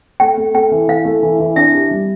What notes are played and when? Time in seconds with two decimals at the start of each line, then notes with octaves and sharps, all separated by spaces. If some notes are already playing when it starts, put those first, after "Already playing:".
0.20 A3 G5
0.37 A3
0.54 A3 G5
0.71 E3
0.88 E3 F5
1.05 A3
1.23 E3
1.40 E3
1.56 D4 E5
1.74 G4
1.91 G3